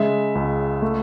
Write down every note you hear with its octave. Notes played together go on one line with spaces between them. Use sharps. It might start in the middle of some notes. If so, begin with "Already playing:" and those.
Already playing: C#3 G#3 E5
C#2
A3